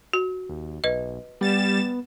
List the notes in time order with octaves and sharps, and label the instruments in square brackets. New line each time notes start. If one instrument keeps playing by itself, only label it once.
[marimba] F#4
[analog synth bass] D#2
[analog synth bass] B1 [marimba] B4 D#5
[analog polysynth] G3 A6 E7 [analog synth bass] B3